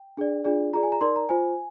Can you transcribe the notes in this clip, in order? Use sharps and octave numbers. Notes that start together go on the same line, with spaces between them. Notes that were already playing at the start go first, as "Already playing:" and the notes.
Already playing: G5
D4 G#4 D5
D4 F4 G#4 D5
F4 G#4 D5 A#5
G#5
A#5
D#4 A#4 D5 C6
A#5
F4 C5 G#5